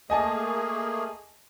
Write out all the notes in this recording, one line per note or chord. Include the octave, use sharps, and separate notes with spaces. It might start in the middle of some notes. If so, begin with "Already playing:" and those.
A3 A#3 G#4 D#5 G#5 A5